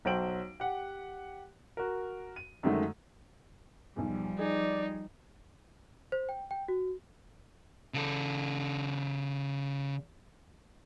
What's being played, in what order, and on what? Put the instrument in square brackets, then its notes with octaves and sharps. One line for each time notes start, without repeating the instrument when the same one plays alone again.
[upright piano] B1 F#3 C5 G5 D7 F#7
G4 F#5
F#4 A#4
D#7
F#2 D3 D#3 G#3 A3
[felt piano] B1 E2 [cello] F3 G3
[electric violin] D#4 [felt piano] G#4 [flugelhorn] D5
[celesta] C5
G5
G5
F#4
[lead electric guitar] C#3 A4